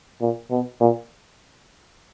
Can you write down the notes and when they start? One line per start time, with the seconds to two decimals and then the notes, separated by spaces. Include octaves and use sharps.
0.21 A#2
0.51 B2
0.80 A#2